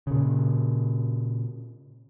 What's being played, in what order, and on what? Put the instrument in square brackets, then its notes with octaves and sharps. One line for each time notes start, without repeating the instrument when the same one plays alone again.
[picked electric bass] A#2 C#3